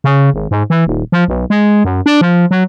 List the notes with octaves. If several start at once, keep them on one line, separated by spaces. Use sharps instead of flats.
C#3
G#1
G#2
E3
D#1
F3
B1
G#3
F#2
D4
F3
F#3